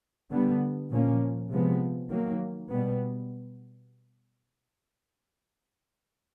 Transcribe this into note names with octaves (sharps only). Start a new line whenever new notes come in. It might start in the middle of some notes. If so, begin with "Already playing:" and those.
D3 G3 B3
A#2 F3 A#3 C#4
C3 F3 G#3 B3
D#3 F#3 A#3
B2 G3 B3